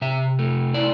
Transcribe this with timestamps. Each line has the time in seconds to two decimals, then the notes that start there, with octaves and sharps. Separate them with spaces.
0.02 C3 E5
0.39 A3
0.74 E4 D5